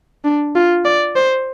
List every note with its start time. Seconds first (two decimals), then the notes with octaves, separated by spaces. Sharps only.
0.24 D4
0.55 F4
0.85 D5
1.16 C5